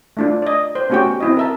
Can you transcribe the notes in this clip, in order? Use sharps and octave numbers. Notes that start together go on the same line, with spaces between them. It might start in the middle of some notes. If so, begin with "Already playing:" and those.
A3 D4 F4
D5 D#5
C5
A3 B3 C#4 F#4 G4 G5
C4 E4 D#5
A#4 E5 A5